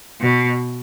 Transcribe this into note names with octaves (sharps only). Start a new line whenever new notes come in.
B2